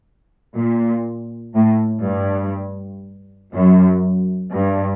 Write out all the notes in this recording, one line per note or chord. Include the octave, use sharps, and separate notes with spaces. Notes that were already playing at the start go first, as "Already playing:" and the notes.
A#2
A2
G2
F#2
G2